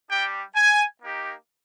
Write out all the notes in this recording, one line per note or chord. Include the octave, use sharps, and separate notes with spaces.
G3 D4 G4 G5
G#5
A#3 D#4 G4